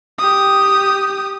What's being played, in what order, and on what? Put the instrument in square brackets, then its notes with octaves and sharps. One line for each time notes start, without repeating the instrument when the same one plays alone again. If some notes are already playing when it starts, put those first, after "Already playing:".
[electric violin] G4 D#6